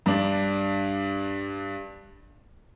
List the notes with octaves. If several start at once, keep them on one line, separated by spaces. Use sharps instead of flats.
G2 D4